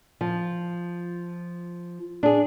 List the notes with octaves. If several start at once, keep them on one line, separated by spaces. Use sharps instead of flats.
F3
D4 G#4